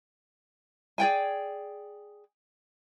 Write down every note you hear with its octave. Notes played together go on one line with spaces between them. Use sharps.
G#4 D5 G5 G#5